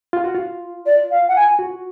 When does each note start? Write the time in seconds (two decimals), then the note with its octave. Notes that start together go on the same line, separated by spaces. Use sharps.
0.13 F4
0.24 F#4
0.35 F4
0.85 D5
1.10 F5
1.28 F#5
1.35 G#5
1.59 F#4